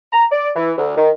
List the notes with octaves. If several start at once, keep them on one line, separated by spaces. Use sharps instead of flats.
A#5
D5
E3
D2
D#3